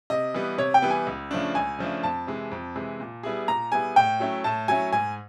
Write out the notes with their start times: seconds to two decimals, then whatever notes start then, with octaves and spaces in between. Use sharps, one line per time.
0.10 C3 D#5
0.34 E3 G3 B3
0.58 C3 C#5
0.74 G5
0.82 E3 G3 B3
0.91 G#5
1.07 C#2
1.31 C#3 F3 A3 D4
1.55 C#2 G#5
1.79 C#3 F3 A3 D4
2.03 F2 A5
2.27 C3 E3 G#3
2.51 F2
2.76 C3 E3 G#3
3.00 A#2
3.23 G3 B3 E4 G#4
3.48 A#2 A#5
3.72 G3 B3 E4 G#4 G#5
3.96 A2 G5
4.20 F#3 A3 C#4 E4
4.44 A2 A5
4.68 F#3 A3 C#4 E4 G#5
4.92 G#2 G#5